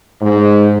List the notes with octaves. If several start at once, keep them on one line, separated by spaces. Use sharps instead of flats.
G#2